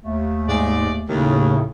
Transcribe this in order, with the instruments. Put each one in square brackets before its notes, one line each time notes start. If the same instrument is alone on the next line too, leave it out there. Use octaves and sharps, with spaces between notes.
[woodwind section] D#2 A3
[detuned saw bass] G#2 [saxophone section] G#3 D5
[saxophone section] D#2 [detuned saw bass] A2 [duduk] C#3